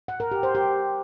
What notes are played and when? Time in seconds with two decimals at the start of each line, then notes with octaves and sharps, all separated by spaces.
0.08 F#5
0.20 A#4
0.32 G4
0.43 C5
0.55 G4